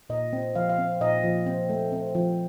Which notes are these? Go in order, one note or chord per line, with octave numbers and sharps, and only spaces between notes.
A#2 D#5
C4
F3 F5
F5
C4
A#2 D#5
F3
C4
A3
C4
F3